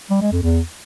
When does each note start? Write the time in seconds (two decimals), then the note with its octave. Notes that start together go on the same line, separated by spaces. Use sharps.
0.11 G3
0.21 G#3
0.32 F2
0.43 E2